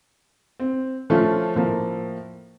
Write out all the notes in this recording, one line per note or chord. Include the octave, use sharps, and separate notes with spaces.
C4
F3 A3 C#4 F4
A2 F3 A#3